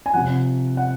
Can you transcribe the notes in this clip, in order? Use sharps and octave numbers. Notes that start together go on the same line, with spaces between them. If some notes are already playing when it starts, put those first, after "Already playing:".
G#5
C3 F3 F#5
F#5